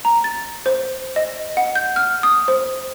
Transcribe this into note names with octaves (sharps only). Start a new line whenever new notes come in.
A#5
A6
C5
D#5
F#5
G6
F6
D#6
C5